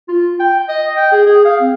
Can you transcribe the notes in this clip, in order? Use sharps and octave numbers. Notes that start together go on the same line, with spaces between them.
F4
G5
D#5
G5
G#4
G#4
F5
C4